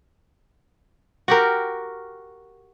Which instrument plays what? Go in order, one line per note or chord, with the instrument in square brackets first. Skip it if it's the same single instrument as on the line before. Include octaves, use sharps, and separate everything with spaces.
[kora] F#4 G4 A#4